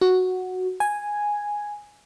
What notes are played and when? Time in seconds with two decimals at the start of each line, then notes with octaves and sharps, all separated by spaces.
0.01 F#4
0.80 G#5